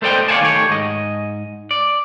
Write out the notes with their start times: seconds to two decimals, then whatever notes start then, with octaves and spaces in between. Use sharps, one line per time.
0.02 A3 A4 C5 D5 D#5 G5
0.28 C#5 D5 F5 F#5 G#5 A5
0.41 D#3 A3 G4 C#5
0.70 G#2 D#5
1.71 D5